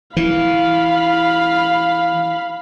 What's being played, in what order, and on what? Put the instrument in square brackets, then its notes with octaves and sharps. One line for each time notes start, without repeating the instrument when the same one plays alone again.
[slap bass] E3 [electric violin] F5 B5